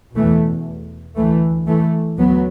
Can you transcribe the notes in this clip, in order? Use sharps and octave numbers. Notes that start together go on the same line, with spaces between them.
E2 B2 E3 A3
D2 E3 A3
E3 A3
D2 F#3 B3